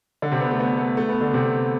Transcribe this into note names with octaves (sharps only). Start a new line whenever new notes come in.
D3 D4
C3 C4
B3
A3
B3
A3
A3
B3
D3 D4
C3 C4